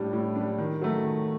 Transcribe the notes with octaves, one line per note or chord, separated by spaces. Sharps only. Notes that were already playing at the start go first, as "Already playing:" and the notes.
Already playing: A2 G3 D4
A2
D4
G3
D#3
F#3 A3
D#3